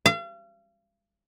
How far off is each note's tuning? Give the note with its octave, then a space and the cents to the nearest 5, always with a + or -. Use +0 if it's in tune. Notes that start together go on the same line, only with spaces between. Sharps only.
F5 -40